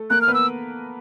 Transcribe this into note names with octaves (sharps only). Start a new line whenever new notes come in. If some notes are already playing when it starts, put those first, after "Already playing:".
Already playing: A3 A4
A#3 A#4 F#6
F6
B3 B4
E6